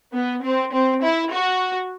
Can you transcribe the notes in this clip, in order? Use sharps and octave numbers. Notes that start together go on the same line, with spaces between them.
B3
C4
C4
E4
F#4